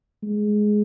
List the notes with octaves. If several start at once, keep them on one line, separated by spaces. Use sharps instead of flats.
G#3